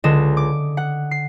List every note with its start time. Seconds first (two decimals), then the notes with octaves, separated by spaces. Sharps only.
0.04 C#2 D3 D#5 E7
0.37 D6
0.77 F#5
1.11 C7